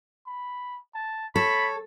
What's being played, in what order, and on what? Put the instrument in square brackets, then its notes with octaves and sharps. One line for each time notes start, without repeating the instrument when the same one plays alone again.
[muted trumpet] B5
A5
[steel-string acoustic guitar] A4 [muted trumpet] C#5 [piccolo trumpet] B5